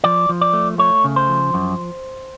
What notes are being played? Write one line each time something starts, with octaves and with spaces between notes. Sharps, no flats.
F3 D5
F3
D5
A3
A3 C#5
C#3
C5
F3
F#2